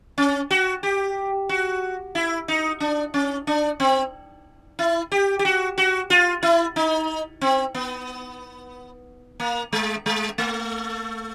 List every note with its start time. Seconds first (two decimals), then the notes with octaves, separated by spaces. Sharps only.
0.18 C#4
0.51 F#4
0.83 G4
1.49 F#4
2.15 E4
2.48 D#4
2.80 D4
3.14 C#4
3.47 D4
3.80 C4
4.79 E4
5.12 G4
5.39 G4
5.45 F#4
5.78 F#4
6.10 F4
6.43 E4
6.76 D#4
7.41 C4
7.75 B3
9.40 A#3
9.73 G#3
10.06 G#3
10.38 A3